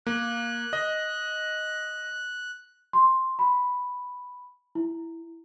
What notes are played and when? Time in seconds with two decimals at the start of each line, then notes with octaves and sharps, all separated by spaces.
0.07 A#3 F#6
0.73 D#5
2.93 C6
3.39 B5
4.75 E4